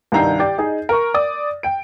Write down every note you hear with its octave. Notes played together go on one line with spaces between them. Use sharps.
C2 G2 D#3 A#5 G6 C7
G4 D5
D#4 G#4 D#5
A#4 C#6
D5 D#6
G5 D7